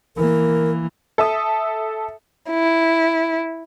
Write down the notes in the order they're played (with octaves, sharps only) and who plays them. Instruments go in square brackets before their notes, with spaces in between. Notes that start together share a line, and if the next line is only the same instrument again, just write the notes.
[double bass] E3 A#3 [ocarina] A#4
[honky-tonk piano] A4 E5 A5 D#6
[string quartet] E4